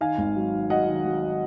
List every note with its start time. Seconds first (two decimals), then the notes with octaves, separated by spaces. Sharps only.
0.01 D#3 F5 G#5
0.18 G#1
0.36 F#3
0.53 D#3
0.70 F#3 D#5 F#5
0.87 D#3
1.05 F#3